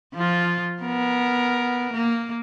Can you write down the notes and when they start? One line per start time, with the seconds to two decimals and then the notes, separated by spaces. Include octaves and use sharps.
0.14 F3 F4
0.82 B3 A#4
1.93 A#3